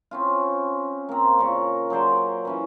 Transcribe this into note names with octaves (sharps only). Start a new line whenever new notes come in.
C4 C#4 F4
A#3 C4
A#2 C#3 A#4 C#6
F#3 G#4 C5 D5
E3 C#4 B4